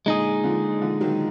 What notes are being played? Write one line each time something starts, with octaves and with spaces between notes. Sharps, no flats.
A#2 D3 G#3 D#4 G#4
D3 F3
D3 F3
D#3 F#3